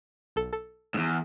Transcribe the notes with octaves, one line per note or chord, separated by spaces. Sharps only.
B1 A4
A4
E2 G#2